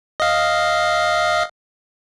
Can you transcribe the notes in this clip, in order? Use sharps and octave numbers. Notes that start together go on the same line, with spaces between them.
D#5 F5